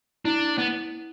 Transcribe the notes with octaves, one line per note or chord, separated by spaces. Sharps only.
D4 E4
B3